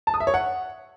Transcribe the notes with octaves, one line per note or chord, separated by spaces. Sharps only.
A5
D#6
E5
C#5
F#5